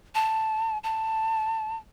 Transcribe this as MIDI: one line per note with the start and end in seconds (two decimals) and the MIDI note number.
0.15 0.78 81
0.84 1.77 81